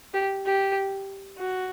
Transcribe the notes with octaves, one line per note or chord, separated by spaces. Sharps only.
G4
G4
F#4